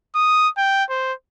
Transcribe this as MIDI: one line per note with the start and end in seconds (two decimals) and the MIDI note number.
0.15 0.49 87
0.57 0.84 79
0.90 1.13 72